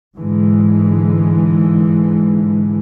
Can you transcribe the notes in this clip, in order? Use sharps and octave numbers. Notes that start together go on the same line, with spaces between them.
G#2 D3 E3 G#3